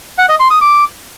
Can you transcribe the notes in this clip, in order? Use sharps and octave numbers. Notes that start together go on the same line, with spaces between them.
F#5
D#5
C6
D#6
D6